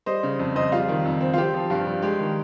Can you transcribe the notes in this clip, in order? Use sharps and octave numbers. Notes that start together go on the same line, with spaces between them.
G3 C5 D#5
C#3
F2
F2 C5 D#5
G3 F4
D#3
F2
C4
F4
C4 G4
F3
G2 F4
G2
G#3 G4
D#3